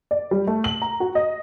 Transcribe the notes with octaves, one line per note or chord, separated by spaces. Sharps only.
D5
G3
A3
F#7
A#5
F#4
D#5